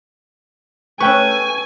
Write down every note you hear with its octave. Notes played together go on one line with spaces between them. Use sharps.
A3 C#4 B4 G5 G#5 C#6